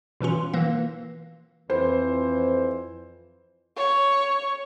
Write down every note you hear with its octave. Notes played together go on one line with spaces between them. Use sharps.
B2 E3 C#4 F4
E3 A#3
F2 E3 C5
C#5